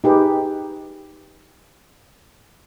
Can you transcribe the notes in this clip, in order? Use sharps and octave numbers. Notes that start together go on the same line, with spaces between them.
D#4 G4 G#4 B4